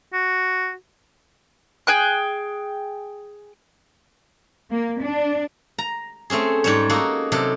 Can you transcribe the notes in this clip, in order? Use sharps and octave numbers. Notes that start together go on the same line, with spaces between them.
F#4
G#4 G5 F#6
A#3
D4
A#5
A3 C4 C#4 G#4
G#2 G3 C#5
A#3 D#4 F#4 A4
C3 F#3 A4